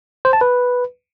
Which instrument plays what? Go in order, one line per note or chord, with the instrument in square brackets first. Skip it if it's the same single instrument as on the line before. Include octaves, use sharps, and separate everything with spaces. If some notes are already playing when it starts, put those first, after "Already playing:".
[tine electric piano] C5
A5
B4